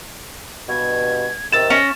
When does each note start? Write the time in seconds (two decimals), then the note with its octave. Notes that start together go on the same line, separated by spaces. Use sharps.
0.69 G2 B2 G#6
1.52 C3 D#3 E6 A6 E7
1.70 C#4 A#6